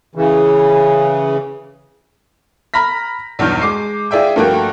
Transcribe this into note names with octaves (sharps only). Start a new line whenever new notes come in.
C#3 E3
A#5 B5 F6 A#6 B6
B1 E2 G2 F6 G6
G#3 D6 C7
F4 G#4 D5 E5 G5
G2 F3 A3 A#3 F#4 G5